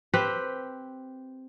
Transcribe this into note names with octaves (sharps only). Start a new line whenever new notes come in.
C4 G4 B4